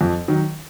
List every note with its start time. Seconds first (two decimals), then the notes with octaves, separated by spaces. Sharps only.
0.01 F2
0.28 D#3 F#3